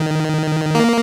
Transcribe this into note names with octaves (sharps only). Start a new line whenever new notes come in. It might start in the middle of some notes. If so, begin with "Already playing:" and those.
Already playing: D#3
A#3